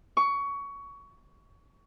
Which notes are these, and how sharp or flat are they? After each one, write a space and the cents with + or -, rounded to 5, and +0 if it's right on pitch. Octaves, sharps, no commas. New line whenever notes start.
C#6 +20